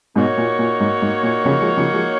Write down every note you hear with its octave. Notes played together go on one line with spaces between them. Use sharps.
G#2 B2 A#3 D#4 F#4 C#5
A#2
A#2
G#2
G#2
A#2
C#3 F3
F3 G#3
C#3 F3
F3 G#3